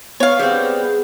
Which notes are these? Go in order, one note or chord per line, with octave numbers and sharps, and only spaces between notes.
B3 C#5 F5 C#6
G3 C4 G#4